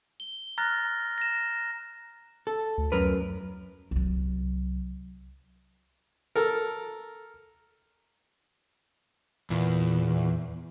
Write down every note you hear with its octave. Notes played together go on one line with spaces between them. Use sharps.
G7
A#5 F6 F#6 A6 A#6
A#6 E7
A4
D2
F#2 A#4 B4
C2 F#3
A4 A#4
E2 A#2